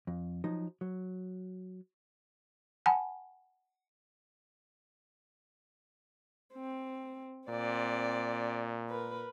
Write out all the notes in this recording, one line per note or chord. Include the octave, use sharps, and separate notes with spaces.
F2
F3 F#3 D#4
F#3
F#5 G#5 A5 B5
C4
A#2 C4 D5
A#4 B4